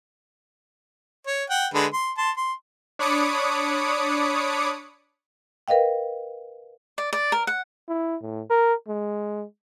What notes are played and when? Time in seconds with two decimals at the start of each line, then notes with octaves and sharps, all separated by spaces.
1.27 C#5
1.50 F#5 G5
1.74 D3 G#3 B4
1.93 C6
2.18 A5 C6
2.37 C6
2.99 D4 C#5 B5 D6 D#6 C#7
5.68 A#4 B4 D#5 F5 G5
6.98 D5
7.13 D5
7.32 A#4
7.47 F#5
7.89 E4
8.22 A2
8.50 A#4
8.88 G#3